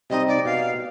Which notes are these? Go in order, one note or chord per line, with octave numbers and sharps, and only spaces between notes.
C3 G3 C4 D#4 D#5
D5
B2 F5